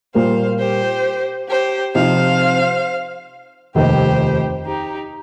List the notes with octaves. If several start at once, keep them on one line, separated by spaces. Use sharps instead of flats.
A#2 G3 A#3 C5 F5
G4 C5
G4 C5
C3 F3 D#4 C5 F5
F1 D#2 D#3 G4 C5
D#4 G4